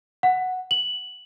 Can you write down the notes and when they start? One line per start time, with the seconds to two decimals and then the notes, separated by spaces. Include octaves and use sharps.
0.23 F#5
0.71 F#7